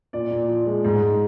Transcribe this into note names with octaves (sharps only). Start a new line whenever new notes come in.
A#2 D5
A#2
F3
G#3
G#2
G#2